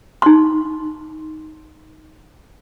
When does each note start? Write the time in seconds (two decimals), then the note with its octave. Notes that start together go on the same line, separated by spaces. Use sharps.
0.22 D#4 C6